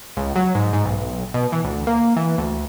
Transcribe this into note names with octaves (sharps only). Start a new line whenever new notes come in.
C#2
F#3
G#2
G#2
B1
B2
E3
D2
A#3
E3
D2